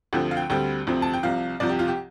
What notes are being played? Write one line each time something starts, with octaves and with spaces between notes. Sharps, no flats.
D2 D3 F3 C4 G4
F5
G5
D2 D3 G3 C4 G5
D2 C3 F3 C4
A5
G5
C2 C3 F3 F5
C2 C3 F3 D5
G4
F4
G4